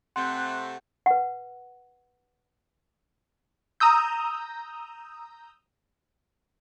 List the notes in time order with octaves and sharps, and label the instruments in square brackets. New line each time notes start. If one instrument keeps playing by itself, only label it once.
[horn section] C3 A3 C4 [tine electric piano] F#5 G6 [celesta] C6 [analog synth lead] F#6
[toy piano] B4 F#5
[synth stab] A#5 D#6 E6 G6